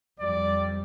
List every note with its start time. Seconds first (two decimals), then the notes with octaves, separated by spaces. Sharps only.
0.20 F2 G3 D5